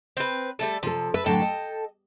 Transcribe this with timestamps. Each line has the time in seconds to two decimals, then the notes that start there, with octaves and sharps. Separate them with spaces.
0.17 C4 B4
0.59 G3 A3 A4
0.83 C3 F3 A4
1.14 A4 B4 E5
1.26 A2 D3 F#3 A4 G5
1.42 D#5